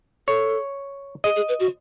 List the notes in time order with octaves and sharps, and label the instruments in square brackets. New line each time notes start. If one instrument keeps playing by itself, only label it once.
[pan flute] A4 [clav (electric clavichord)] C#5
[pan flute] G#4 [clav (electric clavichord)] D#5
[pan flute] G#4
B4
F#4